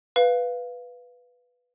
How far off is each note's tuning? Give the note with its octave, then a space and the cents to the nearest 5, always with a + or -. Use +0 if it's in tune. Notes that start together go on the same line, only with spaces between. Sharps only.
B4 +0 F5 +0